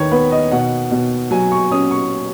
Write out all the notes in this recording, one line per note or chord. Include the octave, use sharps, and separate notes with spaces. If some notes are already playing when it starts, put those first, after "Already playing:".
Already playing: D#2 D#3 B4 C#5
B3 B4
D#5
B2 F#5
B2
F#3 G#5
C#6
C#4 D#6
C#6